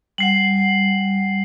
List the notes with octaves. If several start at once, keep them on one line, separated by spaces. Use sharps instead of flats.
G3 F#5 C7 F#7